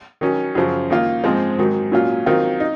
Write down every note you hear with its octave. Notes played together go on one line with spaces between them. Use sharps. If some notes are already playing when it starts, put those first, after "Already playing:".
D#3 F#3 C#4
F#2 C#3 F3
D#3 A#3 F4
G#2 F3 G#3 C4
G#2 D#3 F#3
A#2 F#3 C#4 F4
D#3 F#3 C4 F4
D#4